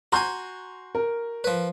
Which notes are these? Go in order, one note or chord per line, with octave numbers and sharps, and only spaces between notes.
F#4 G#5 A#5 C6 G6
A#4
F3 B4